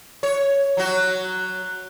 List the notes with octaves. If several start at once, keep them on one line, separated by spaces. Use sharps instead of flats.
C#5
F#3 F#4